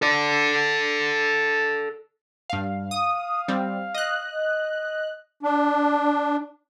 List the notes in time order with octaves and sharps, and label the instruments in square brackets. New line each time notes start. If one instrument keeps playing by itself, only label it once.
[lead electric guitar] A4 D5
[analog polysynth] G2 F5
[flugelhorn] F5 [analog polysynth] D#6
[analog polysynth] G3 C4
D#5 F#6
[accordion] D4